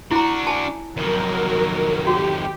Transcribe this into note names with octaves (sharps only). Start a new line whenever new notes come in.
D4 E4 F#4 A#5
G#5 A5
F2 D#3 F#3 A#4
F#4 G4